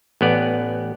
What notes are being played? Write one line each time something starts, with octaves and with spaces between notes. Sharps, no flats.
A1 B3 D5